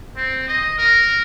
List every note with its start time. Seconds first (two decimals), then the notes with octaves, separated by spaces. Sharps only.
0.17 C4
0.48 D#5
0.78 A#4